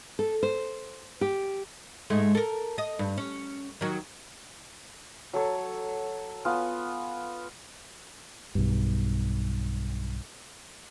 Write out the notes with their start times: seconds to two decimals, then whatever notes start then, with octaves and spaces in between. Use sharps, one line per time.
0.19 A4
0.43 C5
1.21 G4
2.10 G#2 G#3 A3
2.35 A4 A#4
2.78 D#5
2.99 G2
3.18 C#4
3.81 D#3 F#3
5.33 F#3 A4 C#5
6.45 B3 F4 G#5
8.55 B1 G2